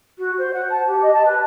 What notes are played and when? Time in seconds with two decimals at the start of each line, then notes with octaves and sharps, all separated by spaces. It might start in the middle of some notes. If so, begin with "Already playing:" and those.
0.18 F#4
0.38 C5
0.53 F#5
0.70 A5
0.87 G4
1.02 D#5
1.13 A5
1.25 B4